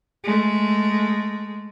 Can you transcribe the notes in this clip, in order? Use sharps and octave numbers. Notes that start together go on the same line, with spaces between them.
G#3 A3